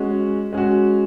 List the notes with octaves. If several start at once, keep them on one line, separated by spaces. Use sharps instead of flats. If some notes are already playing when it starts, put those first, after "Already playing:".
Already playing: G#3 C#4 F#4
G#3 C#4 F#4